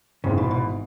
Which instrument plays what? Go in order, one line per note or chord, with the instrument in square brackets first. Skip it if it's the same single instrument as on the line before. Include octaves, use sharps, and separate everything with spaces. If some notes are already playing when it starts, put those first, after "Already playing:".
[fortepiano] G#1 G#2 E3 [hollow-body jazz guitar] C#3
[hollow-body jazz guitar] B2
B2